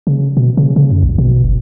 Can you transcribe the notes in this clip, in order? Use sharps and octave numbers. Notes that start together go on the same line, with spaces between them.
C#3
B2
C#3
C#3
F#2
A#1
B2
F#1